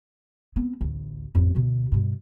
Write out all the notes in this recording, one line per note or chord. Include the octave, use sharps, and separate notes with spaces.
B3 C4
A1 D2
A1 F2
D2 B2
G2 B2